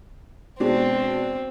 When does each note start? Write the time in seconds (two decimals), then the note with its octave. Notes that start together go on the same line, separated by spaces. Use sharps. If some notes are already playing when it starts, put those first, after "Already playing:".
0.60 B2 G#3 C4 D4